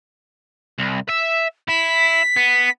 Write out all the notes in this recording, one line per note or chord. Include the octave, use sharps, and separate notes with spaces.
C2
E5
E4 B6
B3